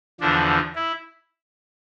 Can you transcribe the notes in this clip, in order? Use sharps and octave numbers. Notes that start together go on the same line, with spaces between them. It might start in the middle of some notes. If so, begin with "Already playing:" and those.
E2 D3 F3 D4
E4